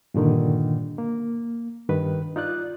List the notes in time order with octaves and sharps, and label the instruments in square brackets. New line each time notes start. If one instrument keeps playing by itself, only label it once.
[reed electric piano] G2 A#2 D3 D#3
A#3
G2 D#3 B4
D#4 F4 D5 F#6